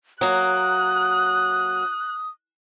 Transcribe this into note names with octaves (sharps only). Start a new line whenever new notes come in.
F#3 A#3 D#6 F#6